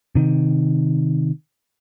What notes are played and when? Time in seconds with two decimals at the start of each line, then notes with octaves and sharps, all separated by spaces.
0.15 C3 D#3